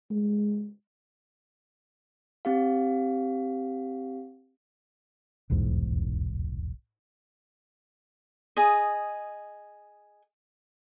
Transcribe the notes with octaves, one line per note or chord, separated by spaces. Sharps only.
G#3
C4 G4 F5
D#1 B1 E2 G#2
G#4 D#5